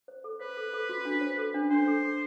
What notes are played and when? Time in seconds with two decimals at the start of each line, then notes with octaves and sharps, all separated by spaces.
0.08 C5
0.24 A4
0.40 B4 C5
0.57 A4
0.74 A4
0.89 F#4
1.05 D4
1.21 C5
1.38 A4
1.54 D4
1.70 D4 C5
1.87 A4
2.03 A4